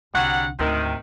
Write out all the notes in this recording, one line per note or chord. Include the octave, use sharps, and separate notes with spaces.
C2 D3 F#3 G3 F#5
D2 G#2 C3 D#3